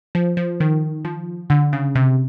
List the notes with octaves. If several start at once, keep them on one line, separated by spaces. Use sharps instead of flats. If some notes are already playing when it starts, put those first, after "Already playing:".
F3
F3
D#3
F3
D3
C#3
C3